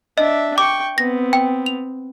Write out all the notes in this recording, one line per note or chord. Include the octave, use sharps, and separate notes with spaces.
D4 D#5 E5
G5 C#6 D6
B3 C4 A#6
G5
F7